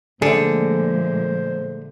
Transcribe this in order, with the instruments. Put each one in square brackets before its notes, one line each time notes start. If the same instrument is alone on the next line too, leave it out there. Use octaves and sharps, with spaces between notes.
[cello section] A#2 F3 G#3 [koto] D3 [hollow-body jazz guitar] A3 G#4 [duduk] C5